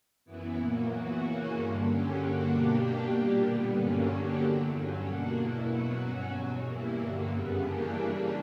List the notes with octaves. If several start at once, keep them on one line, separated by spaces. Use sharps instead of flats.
F#2 E3 B3 E4
A#2 F#3 A#3
E3 B3 F#4
C#3 E3 A#3 C#4 F#4
G2 D3 A#3
D3 F#3 C#4 G4
G2 D3 A#3 D4 F#4
B2 A#3 D4 G4
B2 A#3 D4 G4
A#2 G3 A#3 D4 G4
D3 G3 B3
G2 D3 F#3 A#3 C#4
D3 F#3 A#3 D4 G4
E2 D3 F#3
G2 D3 F#3 C#4
B2 A#3 D4 F#4
E2 B2 A#3 E4
B2 F#3 B3 F#4
G2 F#3 C#4 F#4
E2 B2 F#3
E3 G3 A#3 E4
G2 D3 F#3 A#3
F#2 C#3 G3 B3
C#3 E3 A#3 D4 G4
C#3 E3 G3 A#3 D4